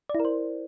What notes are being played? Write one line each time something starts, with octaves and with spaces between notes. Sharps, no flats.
D5
E4
A#4
C5